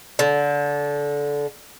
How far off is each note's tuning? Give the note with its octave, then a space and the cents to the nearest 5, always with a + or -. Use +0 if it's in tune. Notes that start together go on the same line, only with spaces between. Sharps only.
D3 -20